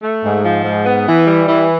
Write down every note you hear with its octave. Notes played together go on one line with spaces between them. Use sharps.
A3
G#2
F3
G#2
B3
E3
G3
E3